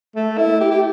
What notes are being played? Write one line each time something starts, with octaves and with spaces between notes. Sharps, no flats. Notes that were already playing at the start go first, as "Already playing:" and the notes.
A3
E4
G4
G4